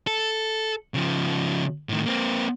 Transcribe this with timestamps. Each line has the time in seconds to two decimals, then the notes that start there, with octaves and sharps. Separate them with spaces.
0.07 A4
0.94 C#3 F3
1.89 A2 D#3
2.06 A#3 C4